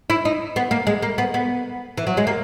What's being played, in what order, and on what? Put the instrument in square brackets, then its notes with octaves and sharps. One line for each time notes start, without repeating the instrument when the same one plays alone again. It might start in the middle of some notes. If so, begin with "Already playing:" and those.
[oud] E4
D#4
B3
A#3
G#3
A#3
B3
B3
E3
F#3
G#3
A#3